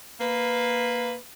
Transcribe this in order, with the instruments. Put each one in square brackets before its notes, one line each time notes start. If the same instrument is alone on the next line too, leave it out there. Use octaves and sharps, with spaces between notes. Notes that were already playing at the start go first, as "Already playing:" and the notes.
[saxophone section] A#3 B4